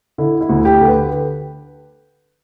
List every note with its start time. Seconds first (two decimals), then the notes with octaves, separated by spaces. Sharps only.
0.18 D3 E4
0.41 E4
0.49 D2
0.65 G4
0.81 D3
0.88 B4